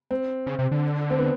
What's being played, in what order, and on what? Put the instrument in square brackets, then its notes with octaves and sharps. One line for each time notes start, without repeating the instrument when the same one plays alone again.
[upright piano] C4
[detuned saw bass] C#3
C3
D3
[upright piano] C4
B3